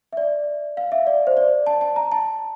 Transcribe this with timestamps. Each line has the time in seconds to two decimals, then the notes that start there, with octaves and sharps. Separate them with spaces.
0.13 E5
0.17 D5
0.77 F5
0.92 E5
1.07 D5
1.27 C5
1.37 D5
1.67 A5
1.81 A5
1.96 A#5
2.12 A5